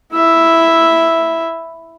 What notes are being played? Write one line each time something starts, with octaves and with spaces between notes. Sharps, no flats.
E4 E5